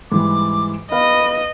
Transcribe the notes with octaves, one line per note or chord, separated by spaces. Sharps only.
G#2 E3 G3 D6
B3 B4 D#5 F5 B5